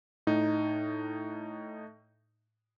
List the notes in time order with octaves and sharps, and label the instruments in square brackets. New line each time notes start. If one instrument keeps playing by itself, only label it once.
[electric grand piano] A2 D#4